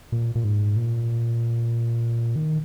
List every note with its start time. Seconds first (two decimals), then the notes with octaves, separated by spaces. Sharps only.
0.12 A#2
0.35 A#2
0.44 G#2
0.76 A#2
2.36 D#3